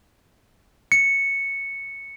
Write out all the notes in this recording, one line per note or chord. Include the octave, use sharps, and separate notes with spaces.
C#7